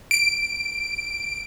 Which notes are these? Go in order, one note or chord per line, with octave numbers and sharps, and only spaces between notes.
D7